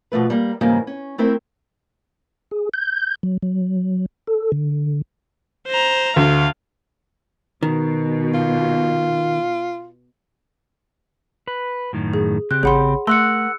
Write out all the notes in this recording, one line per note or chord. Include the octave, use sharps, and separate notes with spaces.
B2 F3 A3 B4
G3 A#3
G#2 C#3 E3 G3 A#3
C#4
A3 C4 E4 A#4 C5
G#4
G6
F#3
F#3
A4
D3
C5 A#5
D2 F5
B2 D#3
F4
B4
F#2 A2 D#3
G#4
C#3 C4 G4 F#6
A1 G#4 C#5 F#5 B5 C6
A3 A#4 F#5 C6 E6 F#6 C#7